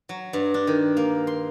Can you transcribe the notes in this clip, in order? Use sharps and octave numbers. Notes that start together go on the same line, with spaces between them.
F#3
G2
D4
D#3
A#3
C6